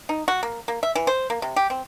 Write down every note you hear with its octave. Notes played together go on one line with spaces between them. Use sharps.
D#4
F#4
A#3
A#3
E5
E3
C5
A#3
C3
G4
C4